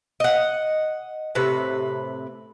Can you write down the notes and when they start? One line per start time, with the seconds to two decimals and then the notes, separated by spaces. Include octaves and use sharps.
0.20 D#5 F#5
1.35 A2 C3 B4